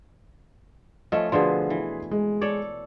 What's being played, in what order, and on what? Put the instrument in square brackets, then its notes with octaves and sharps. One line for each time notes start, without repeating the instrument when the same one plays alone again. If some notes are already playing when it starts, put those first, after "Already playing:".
[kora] F3 A3 C#4 [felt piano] D#5
[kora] B2 D3 F3 [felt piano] G#4 B4 C6
[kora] E3
[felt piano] G#3
[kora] A4 C#5 D5